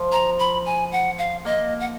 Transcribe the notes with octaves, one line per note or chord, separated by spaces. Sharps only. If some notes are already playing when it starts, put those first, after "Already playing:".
Already playing: F3
A#5
B5
G#5
F#5
F5
A#3 D#5
F#5